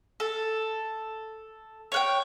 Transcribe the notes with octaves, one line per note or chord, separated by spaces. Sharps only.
A4
C#5 F#5 G5